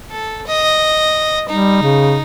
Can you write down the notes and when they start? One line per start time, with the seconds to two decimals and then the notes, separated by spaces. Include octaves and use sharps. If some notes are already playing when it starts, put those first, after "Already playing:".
0.11 A4
0.47 D#5
1.49 G3 D#4
1.82 C#3